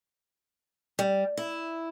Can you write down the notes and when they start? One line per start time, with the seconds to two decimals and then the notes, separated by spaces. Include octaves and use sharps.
0.99 G3
1.37 E4